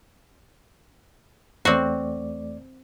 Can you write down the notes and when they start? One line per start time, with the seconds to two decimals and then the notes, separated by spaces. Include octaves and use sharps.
1.65 E2 A3 C4 F#4 D5